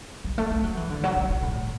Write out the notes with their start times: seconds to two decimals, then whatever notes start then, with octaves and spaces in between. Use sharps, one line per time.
0.24 F#3
0.38 A3
0.50 A3
0.64 F#3
0.77 E3
0.90 D3
1.03 F#3
1.16 D3
1.30 C#3
1.42 A2
1.56 A2